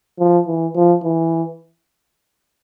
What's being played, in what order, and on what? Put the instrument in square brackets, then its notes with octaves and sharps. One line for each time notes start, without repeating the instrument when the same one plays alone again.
[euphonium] F3
E3
F3
E3